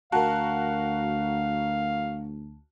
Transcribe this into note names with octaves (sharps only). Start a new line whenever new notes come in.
D2 F#4 A#4 F5 A5